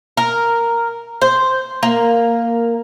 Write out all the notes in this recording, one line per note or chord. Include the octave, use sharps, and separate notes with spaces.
A#4
C5
A#3